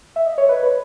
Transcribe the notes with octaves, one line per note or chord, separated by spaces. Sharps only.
E5
D#5
C#5
B4
B4